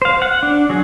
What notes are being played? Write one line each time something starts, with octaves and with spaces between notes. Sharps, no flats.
C5 F5
F#5
D4
F#3 F#4 G#4